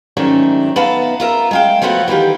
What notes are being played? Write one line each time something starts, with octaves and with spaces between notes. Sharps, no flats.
G#2 D#3 F#3 A3 C#4 D4
B3 D#4 E5 F5 A5
F4 A#4 E5
G#3 F5 G5
F3 A3 B3 F#4 C#5
D#3 E3 F4 G4